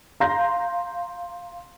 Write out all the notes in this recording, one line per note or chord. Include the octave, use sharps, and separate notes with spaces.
F5 A#5 C6 G6 A#6